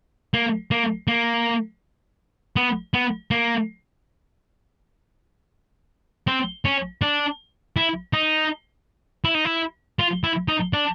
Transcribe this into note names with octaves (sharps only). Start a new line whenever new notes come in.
A#3
A#3
A#3
B3
B3
A#3
C4
C#4
D4
E4
D#4
E4
D#4
E4
F4
E4
D#4
D4